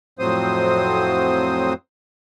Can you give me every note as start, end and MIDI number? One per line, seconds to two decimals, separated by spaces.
0.19 1.74 41
0.19 1.74 45
0.19 1.74 54
0.19 1.74 60
0.19 1.74 72
0.19 1.74 87